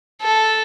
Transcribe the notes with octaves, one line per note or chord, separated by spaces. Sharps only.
A4